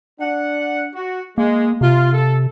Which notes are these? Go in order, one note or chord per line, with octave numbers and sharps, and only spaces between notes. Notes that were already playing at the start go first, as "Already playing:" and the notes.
D4 F#5
F#4
G#3 A#3
C3 F4
A4